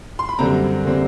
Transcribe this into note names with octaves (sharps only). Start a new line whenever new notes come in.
C6
B5
F#2 D3 G3 C4 A#5
D3 G3 C4